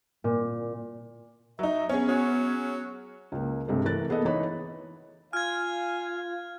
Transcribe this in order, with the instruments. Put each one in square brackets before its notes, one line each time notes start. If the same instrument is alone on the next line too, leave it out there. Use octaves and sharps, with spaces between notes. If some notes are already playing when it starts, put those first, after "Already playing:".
[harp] A#2
[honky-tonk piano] F#3 D#4 [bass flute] E5
[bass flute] B3 [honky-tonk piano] C#4 G#4
[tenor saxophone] F#3
[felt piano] C#2 A#3
C2 G2 C3 G#3 A3
E3 A3 A#4 F#6 A6
A#3 B3 G#4 A4 D#5
E3 D#4 C#5 B5
[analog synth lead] F4 [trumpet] F5 [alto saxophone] G#5 [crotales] F6 G#6